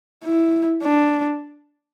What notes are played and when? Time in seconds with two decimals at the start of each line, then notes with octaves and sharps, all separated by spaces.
0.24 E4
0.83 D4